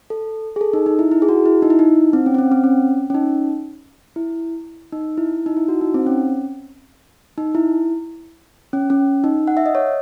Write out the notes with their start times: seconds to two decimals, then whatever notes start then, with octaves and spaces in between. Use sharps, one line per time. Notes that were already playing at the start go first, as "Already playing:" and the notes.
0.10 A4
0.56 G#4
0.61 A4
0.73 D#4
0.86 D#4
0.99 E4
1.11 E4
1.22 G#4
1.29 F#4
1.46 E4
1.62 D#4
1.70 E4
1.79 D#4
2.13 C4
2.26 C#4
2.35 C4
2.38 C#4
2.52 C4
2.64 C#4
3.10 C#4
3.15 D#4
4.16 E4
4.93 D#4
5.18 E4
5.46 D#4
5.57 E4
5.68 F#4
5.81 D#4
5.94 C4
6.06 C#4
7.38 D#4
7.55 E4
8.73 C#4
8.90 C#4
9.24 D#4
9.48 F#5
9.57 E5
9.66 D#5
9.75 C#5